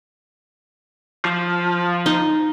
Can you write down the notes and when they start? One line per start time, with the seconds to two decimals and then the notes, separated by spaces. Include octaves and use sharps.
1.25 F3
2.06 D#4